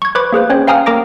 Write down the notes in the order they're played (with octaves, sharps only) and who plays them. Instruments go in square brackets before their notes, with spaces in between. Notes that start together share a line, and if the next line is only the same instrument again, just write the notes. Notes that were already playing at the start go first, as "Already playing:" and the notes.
[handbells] C#6 G#6
B4 C5 B5 C#6 D6 G#6
A#3 G#4 B4 C5
C#4 C5 C#5 G5
F5 G5 G#5 A#5 D#6 F6
A#3 A#4 A#5 D6 A#6 D7